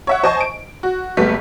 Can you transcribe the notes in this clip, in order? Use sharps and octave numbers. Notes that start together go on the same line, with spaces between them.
C#5 E5 F#5
C5 D#5 G#5 A5 C#6
D7
F#4
F#1 G3 A3 B3 B6